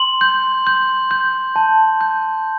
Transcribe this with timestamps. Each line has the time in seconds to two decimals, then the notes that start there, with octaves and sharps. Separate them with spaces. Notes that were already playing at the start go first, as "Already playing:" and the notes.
Already playing: C6 F#7
0.21 G6
0.67 G6
1.11 G6
1.56 A5
2.01 G6